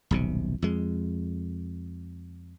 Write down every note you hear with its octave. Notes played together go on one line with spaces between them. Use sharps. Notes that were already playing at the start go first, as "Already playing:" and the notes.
D#1 B1 C3
F2 G#3